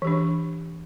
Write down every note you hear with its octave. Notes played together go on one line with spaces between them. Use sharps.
E3 D4 G4